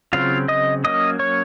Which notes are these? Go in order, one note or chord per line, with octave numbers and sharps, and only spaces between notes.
C#3 F#3 C4 F4 F5
D#5 D#6
F#3 A#3 C#4 D#5 D#6
C#5 C#6